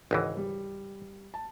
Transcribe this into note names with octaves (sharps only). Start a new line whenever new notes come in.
G#1 C#2 E3 D#5 F#5
G3
A5